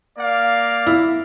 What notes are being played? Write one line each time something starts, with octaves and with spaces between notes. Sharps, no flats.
A#3 D5 F5
E4